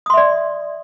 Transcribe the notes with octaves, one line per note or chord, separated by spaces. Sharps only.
D5 E5 C6 D#6